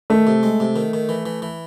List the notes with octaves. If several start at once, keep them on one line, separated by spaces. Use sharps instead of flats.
D#3 A3
C3
G#3
C3
D#3
D#3
E3
E3
E3